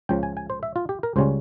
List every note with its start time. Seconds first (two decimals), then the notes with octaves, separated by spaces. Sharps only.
0.09 C#2 C#3 F3 G5
0.23 G#5
0.37 G#5
0.50 C5
0.63 E5
0.76 F4
0.89 G4
1.03 A#4
1.16 C#2 C#3 G3 C#4 C5